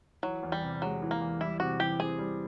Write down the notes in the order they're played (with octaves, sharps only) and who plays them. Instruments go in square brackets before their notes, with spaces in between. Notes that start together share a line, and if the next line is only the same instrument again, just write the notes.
[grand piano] E3 [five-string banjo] F#3
[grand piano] E2
[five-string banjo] G3
[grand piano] C3
[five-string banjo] F#3 [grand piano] G#3
[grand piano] E3
[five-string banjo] A#3
[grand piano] E2
[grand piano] G3 [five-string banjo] E4
[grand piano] C3 [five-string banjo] F#4
[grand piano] E3 [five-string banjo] G4
[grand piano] C4 [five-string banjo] G#4
[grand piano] G3